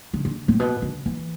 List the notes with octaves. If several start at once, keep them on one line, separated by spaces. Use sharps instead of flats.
D3
D3
A2
B2
D3
E3